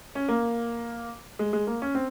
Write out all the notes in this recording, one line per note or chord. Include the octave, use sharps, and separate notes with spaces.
C#4
A#3
G#3
G#3
A#3
C#4
C4